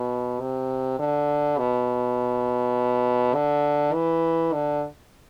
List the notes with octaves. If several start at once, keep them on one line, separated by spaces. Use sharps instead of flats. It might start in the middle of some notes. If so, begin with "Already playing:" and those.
Already playing: B2
C3
D3
B2
D3
E3
D3